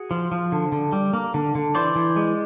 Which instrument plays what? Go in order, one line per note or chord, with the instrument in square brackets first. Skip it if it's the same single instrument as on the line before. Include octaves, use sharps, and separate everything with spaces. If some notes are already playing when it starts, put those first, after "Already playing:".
Already playing: [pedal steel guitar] F#4 G#4
F3
F3
D3
D3
G3
A#3
D3
D3
E3 C5 D5
E3
G#3